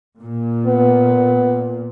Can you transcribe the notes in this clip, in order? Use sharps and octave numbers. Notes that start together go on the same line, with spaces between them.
A#2
B3